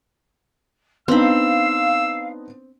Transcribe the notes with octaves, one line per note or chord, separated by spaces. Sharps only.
B3 C4 D4 D#4 F5 B5 E6